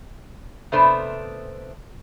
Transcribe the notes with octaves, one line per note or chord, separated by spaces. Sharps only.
C3 A3 B3 D4 C5